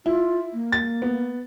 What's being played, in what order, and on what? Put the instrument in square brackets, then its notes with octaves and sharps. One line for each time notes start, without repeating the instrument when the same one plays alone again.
[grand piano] E4 [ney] F4
[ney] A#3
[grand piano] A6
B3